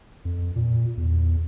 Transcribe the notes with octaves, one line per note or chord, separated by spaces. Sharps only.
F2
A#2
E2